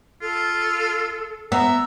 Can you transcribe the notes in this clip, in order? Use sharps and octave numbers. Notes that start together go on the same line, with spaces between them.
F4 A4
B3 E5 A#5